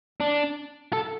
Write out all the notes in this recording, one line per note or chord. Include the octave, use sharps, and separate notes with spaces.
D4
A4